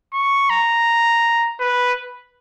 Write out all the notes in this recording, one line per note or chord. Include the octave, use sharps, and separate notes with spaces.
C#6
A#5
B4